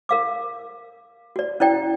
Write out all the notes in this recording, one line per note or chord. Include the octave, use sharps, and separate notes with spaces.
A#4 F5 D6
F#4 D5
C#4 E4 D5 G5